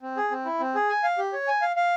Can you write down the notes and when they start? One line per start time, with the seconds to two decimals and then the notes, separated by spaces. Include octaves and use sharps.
0.02 C4
0.17 G#4
0.31 C4
0.45 E4
0.60 C4
0.75 G#4
0.89 G#5
1.04 F5
1.18 G4
1.33 C#5
1.48 G#5
1.62 F5
1.76 F5